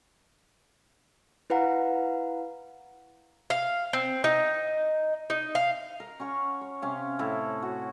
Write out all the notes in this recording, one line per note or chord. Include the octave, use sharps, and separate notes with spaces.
E4 B4 F5 F#5 A#5
F5
C4
D#4
D#4
F5
A#4
C#4 F#5 C#6
C#5
C3 C#4 F5
A2 E4 A4
F#4